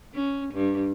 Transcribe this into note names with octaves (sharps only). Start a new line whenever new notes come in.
C#4
G2